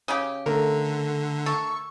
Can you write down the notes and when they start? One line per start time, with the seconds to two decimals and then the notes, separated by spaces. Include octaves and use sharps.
0.08 C#3 C#4 G4
0.46 D3 A3 A#4
1.46 A4 C#6